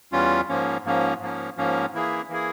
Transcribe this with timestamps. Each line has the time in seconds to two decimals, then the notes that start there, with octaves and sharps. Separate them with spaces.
0.12 E2 E3 G3 C#4 F4
0.48 G#2 F3 A#3 C#4
0.85 G#2 F3 A#3 C#4
1.20 G#2 F3 A#3 C#4
1.57 G#2 F3 A#3 C#4
1.94 E3 A#3 E4 G#4
2.29 E3 A#3 E4 G#4